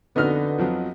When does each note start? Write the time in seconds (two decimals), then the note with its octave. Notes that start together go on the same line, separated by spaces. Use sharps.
0.16 F2 D3 B3 D#4 F#4 D#5 F6
0.58 F2 F3 F#3